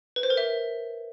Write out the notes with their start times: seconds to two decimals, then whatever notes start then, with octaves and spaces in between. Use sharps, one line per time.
0.16 B4
0.23 C5
0.30 A#4
0.37 E5